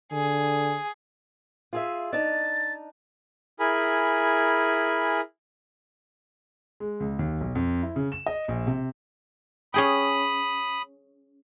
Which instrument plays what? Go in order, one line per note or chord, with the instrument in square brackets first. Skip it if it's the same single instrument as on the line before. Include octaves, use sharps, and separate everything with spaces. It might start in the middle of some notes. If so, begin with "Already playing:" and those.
[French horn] D3 [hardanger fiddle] G#4
[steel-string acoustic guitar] F4 G#4 E5
[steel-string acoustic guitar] D4 D#4 [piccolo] A6
[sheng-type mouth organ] E4 G#4 A#4 G#5 B5
[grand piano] G#3
C#2
D#2
B1
F2
E4
C#3
E7
D#5
A#1
C3
[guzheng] C#4 G#4 G5 [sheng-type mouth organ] B5 D#6